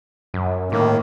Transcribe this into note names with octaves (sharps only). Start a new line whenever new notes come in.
F#2
A2 D#3 A#3